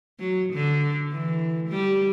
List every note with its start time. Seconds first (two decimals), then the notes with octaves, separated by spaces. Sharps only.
0.19 F#3
0.54 D3
1.12 E3
1.69 G3